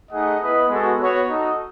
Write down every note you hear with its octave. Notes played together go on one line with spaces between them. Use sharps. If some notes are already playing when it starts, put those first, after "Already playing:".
A3 D#4 G#4 D#5 F#5
B3 E4 B4 D#5
G#3 B3 F#4 A4
B3 F#4 C#5
D#4 F#4 A4 D#5